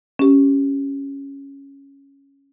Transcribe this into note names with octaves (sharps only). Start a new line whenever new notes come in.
C#4 G4